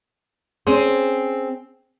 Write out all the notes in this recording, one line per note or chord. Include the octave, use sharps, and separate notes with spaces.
C4 C#4 G#4 C5